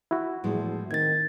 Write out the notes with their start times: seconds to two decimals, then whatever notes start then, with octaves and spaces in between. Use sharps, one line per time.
0.11 E4 F#4
0.44 E2 A2 F3 G#3
0.91 D#3 C4 G#6 A6